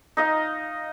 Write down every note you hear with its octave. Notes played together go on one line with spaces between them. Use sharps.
D#4 D#5 F5